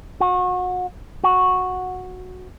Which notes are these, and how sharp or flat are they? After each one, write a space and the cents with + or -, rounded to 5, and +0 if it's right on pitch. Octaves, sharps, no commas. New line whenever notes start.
F#4 -30
F#4 -10